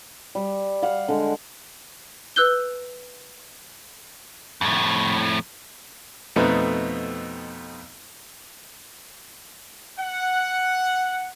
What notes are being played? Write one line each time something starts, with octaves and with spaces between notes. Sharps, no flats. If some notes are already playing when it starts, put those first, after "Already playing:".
G3
F5 F#5
D3 G#3
B4 E6 F#6 G6 G7
F2 A2
F2 B2 A3 B3 C4 D#4
F#5